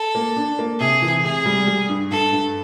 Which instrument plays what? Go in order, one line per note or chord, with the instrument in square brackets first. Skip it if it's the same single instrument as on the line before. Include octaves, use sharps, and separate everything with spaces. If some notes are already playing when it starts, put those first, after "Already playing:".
Already playing: [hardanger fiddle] A4
[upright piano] A#3
D4
A#3
[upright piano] C3 [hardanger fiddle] G#4
[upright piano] E3
[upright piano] C3 [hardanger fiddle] G#4
[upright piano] G3
G3
G2
[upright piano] G2 [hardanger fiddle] A4
[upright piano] G2